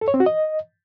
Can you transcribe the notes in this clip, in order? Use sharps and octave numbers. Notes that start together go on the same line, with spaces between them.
A4
C#5
C4
F#4
D#5